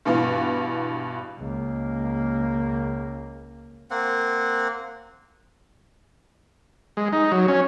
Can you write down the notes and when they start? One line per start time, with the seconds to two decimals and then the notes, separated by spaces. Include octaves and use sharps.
0.05 G2 B2 E3 F4
1.38 C#2 A#3
3.90 A#3 C4 F#5
6.97 G#3
7.13 D#4
7.32 F#3
7.48 C#4